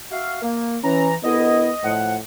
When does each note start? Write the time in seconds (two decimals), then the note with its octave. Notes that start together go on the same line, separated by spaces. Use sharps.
0.11 F#4 E5 F5
0.42 A#3
0.84 E3 C#4 A#5
1.23 C2 D3 B3 E4 D#5
1.84 A2 F3 F#5